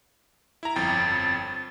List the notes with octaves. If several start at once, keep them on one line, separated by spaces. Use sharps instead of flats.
E4 A#5
G1 F2 G5 A6